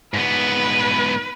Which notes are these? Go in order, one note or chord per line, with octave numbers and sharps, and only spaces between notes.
G#2 B3 B4